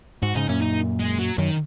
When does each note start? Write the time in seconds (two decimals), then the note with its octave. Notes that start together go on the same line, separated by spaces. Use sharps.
0.23 G#2 F#4
0.35 G#2 C#3 D#4
0.48 F#2 A#2 C#4
0.62 D#4
0.99 G#3
1.19 F#3
1.38 F#2 D#3